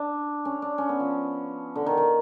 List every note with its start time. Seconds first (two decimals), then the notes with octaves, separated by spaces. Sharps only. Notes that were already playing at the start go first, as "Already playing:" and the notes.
Already playing: D4
0.45 C#4
0.62 D4
0.78 C#4
0.89 B3
1.00 F3
1.75 D3
1.86 D#3
1.98 D#3